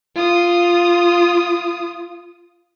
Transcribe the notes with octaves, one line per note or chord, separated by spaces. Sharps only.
F4 D#6